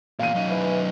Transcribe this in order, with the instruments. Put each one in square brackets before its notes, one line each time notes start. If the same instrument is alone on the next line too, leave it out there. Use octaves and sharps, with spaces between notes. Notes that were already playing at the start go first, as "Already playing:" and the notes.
[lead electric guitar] E2 A#2 [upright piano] F5 D#7
[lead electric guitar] F#2 D#4
[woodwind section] E3